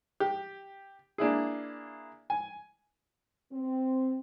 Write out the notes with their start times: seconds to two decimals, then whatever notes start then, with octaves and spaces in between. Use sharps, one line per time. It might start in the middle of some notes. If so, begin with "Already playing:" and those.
0.20 G4
1.18 A#3 D4 E4 G#4
2.30 G#5
3.52 C4